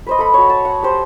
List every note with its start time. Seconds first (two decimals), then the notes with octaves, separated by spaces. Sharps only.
0.07 B4 C5 D#5
0.19 A4 B5
0.34 F#4 C#5
0.49 A5
0.65 F#5
0.83 G4 C5